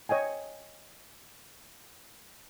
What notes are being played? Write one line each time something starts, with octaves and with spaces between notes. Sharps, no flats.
C#5 D#5 G5 G#5